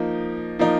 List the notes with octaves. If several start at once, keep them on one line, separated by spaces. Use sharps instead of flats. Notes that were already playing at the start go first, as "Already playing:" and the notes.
Already playing: F3 A#3 D#4
F3 A#3 D#4